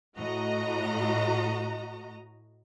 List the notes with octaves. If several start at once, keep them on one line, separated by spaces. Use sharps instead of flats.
A2 F#4 D#5 A#5